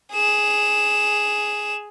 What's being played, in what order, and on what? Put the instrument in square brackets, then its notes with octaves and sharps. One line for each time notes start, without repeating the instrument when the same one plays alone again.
[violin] G#4 E7